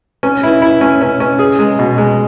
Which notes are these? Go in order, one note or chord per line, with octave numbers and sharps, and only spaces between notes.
C#4
E4
E4
C#4
C#4
C#4
G#4
G#3
B2
G#3